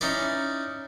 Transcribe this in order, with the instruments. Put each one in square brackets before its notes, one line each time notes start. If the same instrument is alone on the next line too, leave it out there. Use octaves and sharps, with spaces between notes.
[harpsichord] C#4 D#4 E4 D5